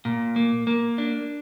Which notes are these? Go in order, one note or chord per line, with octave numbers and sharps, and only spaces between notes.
A#2
A#3
A#3
D4